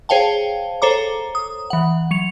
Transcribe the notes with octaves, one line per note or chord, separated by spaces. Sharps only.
G#4 C5 C#5 F5 G5 A5
A4 C5 C#5 A#5 D6
D#6
E3 F#5
F#3 C#7 F7